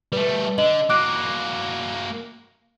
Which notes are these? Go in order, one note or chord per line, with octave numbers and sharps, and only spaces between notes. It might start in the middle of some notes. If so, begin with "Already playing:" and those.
G3 A3 B4
D3 D#5 F#7
A#3 F#4 D6 F#6 D7